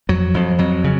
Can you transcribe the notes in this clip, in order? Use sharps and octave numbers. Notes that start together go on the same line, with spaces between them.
F2 F#3
F2
F2 F#3
C#3